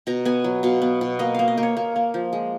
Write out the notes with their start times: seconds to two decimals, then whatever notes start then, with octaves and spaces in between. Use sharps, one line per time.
0.07 B2 A#5
0.25 B3 G#5
0.44 F#3
0.63 B2 F5
0.82 B3
1.01 B2
1.19 A#3 D#5
1.34 A#3 F5
1.48 D#5
1.57 A#3
1.63 C#5
1.77 A#3
1.96 A#3
2.14 F3
2.33 G#3